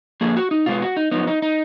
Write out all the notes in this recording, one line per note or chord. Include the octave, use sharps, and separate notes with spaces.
D3 F3 A#3 G#4
F#4
D#4
B2 G#3 B3 F4
F#4
D#4
F#2 F3 B3 D#4
D#4
D#4